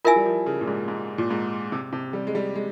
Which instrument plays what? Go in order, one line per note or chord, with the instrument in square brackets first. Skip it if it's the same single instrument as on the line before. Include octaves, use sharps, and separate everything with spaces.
[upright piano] E4 [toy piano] F4 A#4 E5 G#5
[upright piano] G3
F3
C#3
A#2
G#2
G#2
A#2
G#2
C3
C3
G3
G#3
G3
G#3